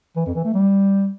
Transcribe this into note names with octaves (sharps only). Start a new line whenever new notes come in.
E3
F2
E3
A3
G3